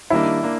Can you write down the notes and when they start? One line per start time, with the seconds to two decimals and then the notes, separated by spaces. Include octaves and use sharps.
0.10 D#3 G3 A#3 D4 E4
0.43 A#3 D4